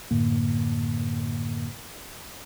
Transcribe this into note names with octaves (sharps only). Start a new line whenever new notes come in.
F#2 A2 D3 A#3